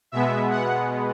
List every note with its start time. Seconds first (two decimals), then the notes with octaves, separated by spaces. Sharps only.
0.12 B2 G#3 B3 E5
0.51 F#5